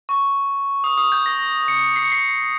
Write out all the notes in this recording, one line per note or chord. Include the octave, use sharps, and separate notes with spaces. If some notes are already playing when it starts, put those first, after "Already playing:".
C#6
D#6
D#6
G6
A#6
A#6
C#7
C7
C#7
C7